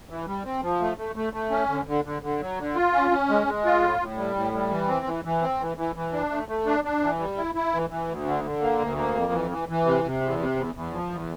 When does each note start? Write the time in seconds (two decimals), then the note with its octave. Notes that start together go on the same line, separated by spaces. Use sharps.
0.09 E3
0.27 G3
0.44 C4
0.62 F3
0.80 A3
0.98 A3
1.16 A3
1.33 A3
1.51 C#4
1.69 D3
1.87 D3
2.05 D3
2.22 D3
2.40 F#3
2.58 D3
2.75 F4
2.93 C#4
3.11 C#4
3.29 G#3
3.47 G#3
3.65 F4
3.82 A2
4.00 A2
4.18 G3
4.36 A2
4.53 G3
4.70 E3
4.88 C4
5.06 E3
5.24 E3
5.42 C4
5.60 E3
5.77 E3
5.95 E3
6.13 D4
6.30 A3
6.48 A3
6.66 D4
6.84 D4
7.02 E3
7.19 G3
7.37 E4
7.55 E4
7.73 E3
7.90 E3
8.08 D2
8.26 D3
8.44 D3
8.61 A#3
8.79 D2
8.97 A#3
9.14 F2
9.32 E3
9.51 E3
9.68 E3
9.86 C3
10.04 C3
10.21 E2
10.38 C3
10.56 E2
10.74 E2
10.92 F3
11.10 E2